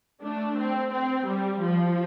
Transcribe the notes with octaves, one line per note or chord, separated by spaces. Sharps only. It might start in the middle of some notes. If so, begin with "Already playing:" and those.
A3 D4
C4
C4
G3
F3